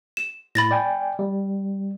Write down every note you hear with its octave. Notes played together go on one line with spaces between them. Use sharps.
E7
A2 B5 A6 A#6
D5 G5 G#5
G3